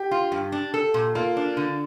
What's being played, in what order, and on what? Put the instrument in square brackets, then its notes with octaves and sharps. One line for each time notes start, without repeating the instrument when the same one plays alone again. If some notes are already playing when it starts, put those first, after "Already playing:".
Already playing: [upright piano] G4
[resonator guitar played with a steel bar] F4
G2
D4
A4
A#2
[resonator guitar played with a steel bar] A#3 [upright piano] F4
[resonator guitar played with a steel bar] D4
D3